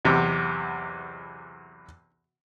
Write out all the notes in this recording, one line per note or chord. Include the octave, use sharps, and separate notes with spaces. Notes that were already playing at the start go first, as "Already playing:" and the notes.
B1 E2 C3